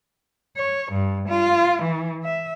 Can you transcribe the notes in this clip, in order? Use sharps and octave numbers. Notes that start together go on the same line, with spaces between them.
C#5
G2
F4
E3
E5